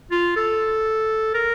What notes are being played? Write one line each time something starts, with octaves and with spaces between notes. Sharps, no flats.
F4
A4
A#4